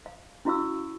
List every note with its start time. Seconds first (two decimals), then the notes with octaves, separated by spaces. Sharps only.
0.06 F5
0.45 C#4 E4 F#4 F5 C#6 E6